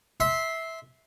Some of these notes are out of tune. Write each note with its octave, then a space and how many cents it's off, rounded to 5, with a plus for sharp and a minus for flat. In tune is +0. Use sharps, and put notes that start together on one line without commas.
E5 -15 C6 +0